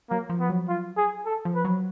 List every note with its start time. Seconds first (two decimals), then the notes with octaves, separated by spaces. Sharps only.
0.10 F#3 A#3
0.29 F3
0.40 B3
0.50 F#3
0.69 F4
0.97 G#4
1.26 A4
1.45 F3
1.55 B4
1.65 F#3